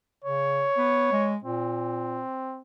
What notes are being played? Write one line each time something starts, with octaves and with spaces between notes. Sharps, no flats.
C#3 C#5
B3
G#3
A#2 C4